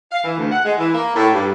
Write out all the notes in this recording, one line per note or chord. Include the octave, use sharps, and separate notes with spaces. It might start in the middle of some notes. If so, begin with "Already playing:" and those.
F5
E3
D2
F#5
G#3
E3
A#3
A2
G2